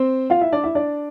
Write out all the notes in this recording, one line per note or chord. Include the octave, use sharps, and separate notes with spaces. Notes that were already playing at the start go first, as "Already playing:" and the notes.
Already playing: C4 C5
F4 F5
E4 E5
D4 D5
E4 E5
D4 D5